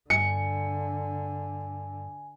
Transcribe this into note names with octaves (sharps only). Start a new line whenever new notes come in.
G2 D3 G#5 C#7